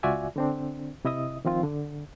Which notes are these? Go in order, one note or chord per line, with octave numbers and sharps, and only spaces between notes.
C#2 F4 F#4 D5 E5 G#5
D3 C4 D4
C3 E4 D#5 E5 D#6
D#3 F3 C4 F4 F5
D3